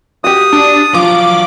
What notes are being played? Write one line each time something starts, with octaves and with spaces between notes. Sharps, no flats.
F#4 G4 D#6
D4
F3 F#3 F4 D6